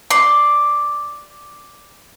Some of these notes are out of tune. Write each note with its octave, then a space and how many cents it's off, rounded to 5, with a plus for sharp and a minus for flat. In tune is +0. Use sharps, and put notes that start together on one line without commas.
D5 +0 C6 +0